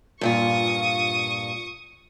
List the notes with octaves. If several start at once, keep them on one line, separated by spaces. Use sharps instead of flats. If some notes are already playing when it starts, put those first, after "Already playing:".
G2 A#2 F4 C#6 D#6